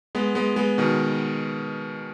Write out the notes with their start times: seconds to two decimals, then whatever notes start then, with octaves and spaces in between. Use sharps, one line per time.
0.15 G#3 B3
0.35 G#3 B3
0.56 G#3 B3
0.78 B2 D#3